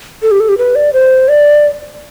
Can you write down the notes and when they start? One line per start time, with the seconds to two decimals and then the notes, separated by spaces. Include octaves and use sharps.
0.22 A4
0.31 G4
0.40 A4
0.49 G4
0.58 B4
0.75 D5
0.93 C5
1.28 D5